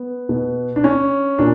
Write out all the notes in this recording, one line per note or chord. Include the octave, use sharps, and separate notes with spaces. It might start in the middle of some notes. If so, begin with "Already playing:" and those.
Already playing: B3
B2
D4
C#4
A#2 D4